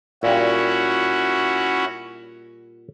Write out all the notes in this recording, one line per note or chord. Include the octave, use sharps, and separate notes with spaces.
A#2 G3 C#4 E4 F#4